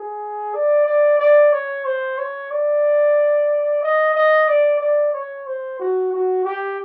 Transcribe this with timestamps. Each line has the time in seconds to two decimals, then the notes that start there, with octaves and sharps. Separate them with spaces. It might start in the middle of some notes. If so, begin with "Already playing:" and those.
Already playing: G#4
0.54 D5
0.86 D5
1.19 D5
1.52 C#5
1.85 C5
2.18 C#5
2.51 D5
3.83 D#5
4.15 D#5
4.48 D5
4.80 D5
5.13 C#5
5.47 C5
5.79 F#4
6.13 F#4
6.44 G4